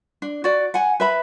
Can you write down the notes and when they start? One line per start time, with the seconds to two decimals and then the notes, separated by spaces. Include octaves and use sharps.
0.22 D4
0.44 F#4 D5
0.74 F#5 G#5
1.00 B4 E5 B5